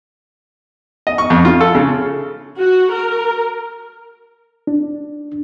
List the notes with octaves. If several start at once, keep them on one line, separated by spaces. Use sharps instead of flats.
D#5
C#6
F2
F4
A4
C#3
F#4
A#4
D4